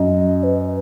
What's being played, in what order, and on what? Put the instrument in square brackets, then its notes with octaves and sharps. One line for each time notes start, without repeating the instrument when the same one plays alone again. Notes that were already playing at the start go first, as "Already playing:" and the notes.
Already playing: [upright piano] F#2 [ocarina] D#5
[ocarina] B4